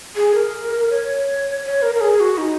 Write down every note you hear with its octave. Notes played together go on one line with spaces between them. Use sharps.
G#4
A#4
C#5
C#5
A#4
A#4
G#4
F#4
D#4